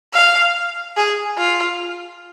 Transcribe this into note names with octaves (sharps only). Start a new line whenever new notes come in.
F5
G#4
F4